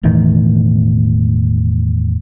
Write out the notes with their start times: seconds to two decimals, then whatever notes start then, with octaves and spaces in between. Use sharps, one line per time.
0.03 E1 E2 A2 D#3